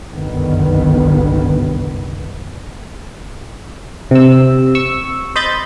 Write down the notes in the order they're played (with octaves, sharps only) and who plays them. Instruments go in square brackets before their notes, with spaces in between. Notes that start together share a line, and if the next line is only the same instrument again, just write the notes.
[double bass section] G1 C2 F#2 D3 D#3 B3
[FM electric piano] C3 E6
C#6 E6
C5 D#5 B5 G6 A6